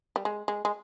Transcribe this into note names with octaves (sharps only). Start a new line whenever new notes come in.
G3
G#3
G#3
G#3